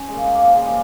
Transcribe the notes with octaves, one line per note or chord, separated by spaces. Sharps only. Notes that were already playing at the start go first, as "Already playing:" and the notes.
Already playing: C#4
G#3 A#3
G#3
A#3
A#2 F3
G#3
G3